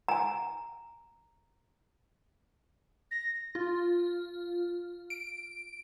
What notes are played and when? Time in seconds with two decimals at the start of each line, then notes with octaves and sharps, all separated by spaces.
0.08 G#5 A#5
3.11 A#6
3.55 F4
5.10 D7